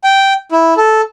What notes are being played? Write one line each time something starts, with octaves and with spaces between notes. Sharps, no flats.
G5
E4
A4